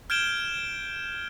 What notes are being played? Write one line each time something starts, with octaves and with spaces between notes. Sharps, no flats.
F6 G6 G#6 D7 E7 G7